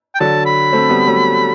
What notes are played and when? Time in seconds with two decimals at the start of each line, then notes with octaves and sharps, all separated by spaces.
0.15 G5
0.20 D3 F#3 A5
0.46 B5
0.73 A3 C4
0.89 G3 B3
1.07 F#3 A3